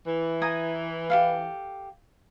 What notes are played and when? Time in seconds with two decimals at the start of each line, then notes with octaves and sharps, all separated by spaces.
0.06 E3
0.42 G#5 A#5 D#6
1.10 G4 A4 F5